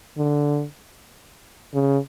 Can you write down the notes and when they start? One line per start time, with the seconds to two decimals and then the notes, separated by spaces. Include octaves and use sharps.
0.17 D3
1.74 C#3